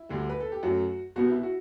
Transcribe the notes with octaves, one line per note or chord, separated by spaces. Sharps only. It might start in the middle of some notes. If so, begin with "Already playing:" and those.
Already playing: E4
D2 D3 G3
B4
A4
G4
F#2 F#3 A3 F#4
C2 B2 G3 B3 F#4
E4
F#4